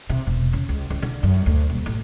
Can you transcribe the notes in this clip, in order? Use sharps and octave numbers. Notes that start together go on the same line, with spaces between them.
C3
E1
C#3
C#2
C#2
D3
F#2
D2
D#1
A1